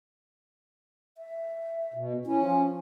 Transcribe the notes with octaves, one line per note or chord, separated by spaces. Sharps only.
E5
B2
C#4 E4
F3